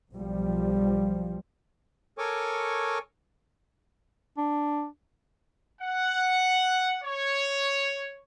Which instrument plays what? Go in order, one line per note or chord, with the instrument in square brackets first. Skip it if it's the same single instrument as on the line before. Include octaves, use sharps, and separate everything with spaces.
[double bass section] B1 F3 G3
[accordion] A4 A#4 C#5 G#5 C#6 D6
[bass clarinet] D4
[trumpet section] F#5
C#5